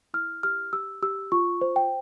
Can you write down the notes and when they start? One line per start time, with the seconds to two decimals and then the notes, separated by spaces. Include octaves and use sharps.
0.14 E4 F6
0.43 G4 F6
0.73 G4 E6
1.02 G4 E6
1.32 F4 C#6
1.61 C5
1.76 G5